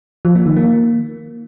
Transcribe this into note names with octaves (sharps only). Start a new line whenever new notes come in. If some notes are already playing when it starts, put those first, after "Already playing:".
F3
A#3
D#3
A#3